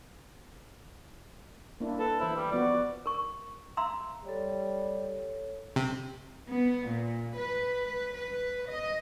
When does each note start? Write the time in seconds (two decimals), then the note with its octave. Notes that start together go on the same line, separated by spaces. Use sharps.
1.80 A#3 D4 E4
1.99 A4 B4
2.20 E3 E4 C5
2.36 G3
2.51 F3 B3 F#4 D5
3.06 A#4 C#6
3.77 E5 F5 A#5 C6 E6
4.25 G3 A4 C#5
5.76 C3
6.50 B3
6.89 A#2
7.36 B4
7.81 B4
8.15 B4
8.68 D#5